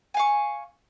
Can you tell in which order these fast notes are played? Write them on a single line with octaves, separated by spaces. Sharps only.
G#5 F5 C#6